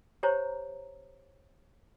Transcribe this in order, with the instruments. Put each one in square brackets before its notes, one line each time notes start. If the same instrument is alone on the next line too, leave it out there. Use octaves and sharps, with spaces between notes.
[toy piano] G4 C5 C#5 A#5